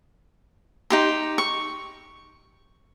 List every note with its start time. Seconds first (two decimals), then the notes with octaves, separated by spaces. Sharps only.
0.90 D#4 G4 C6
1.38 C#6